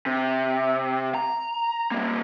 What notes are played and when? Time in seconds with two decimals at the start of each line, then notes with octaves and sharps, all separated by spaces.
0.06 C3
1.14 A#5
1.91 G3 A#3